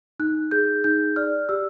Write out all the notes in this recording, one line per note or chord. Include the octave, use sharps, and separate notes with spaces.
D#4 F#6
G#4 G6
D#4 G6
D5 F6
G4 E6